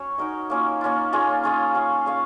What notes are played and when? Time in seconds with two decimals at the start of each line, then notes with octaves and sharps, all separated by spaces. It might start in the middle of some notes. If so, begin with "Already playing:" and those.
Already playing: F#3 C#4 C#5
0.18 D#4 F#4 A#4 D#5
0.50 A#3 C#4 F4
0.81 A#3 C#4 F4
1.13 C#4 F4 G#4 D#5
1.44 C#4 F4 G#4 D#5
1.75 C#4 G#4 C#5 F5
2.06 C#4 G#4 C#5 F5